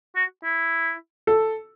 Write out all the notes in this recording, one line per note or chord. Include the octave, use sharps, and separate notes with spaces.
F#4
E4
A4